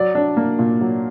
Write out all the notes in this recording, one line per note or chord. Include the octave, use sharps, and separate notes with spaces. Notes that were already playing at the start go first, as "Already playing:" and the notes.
Already playing: F#3 D5
D4
A#3
A#2
F#3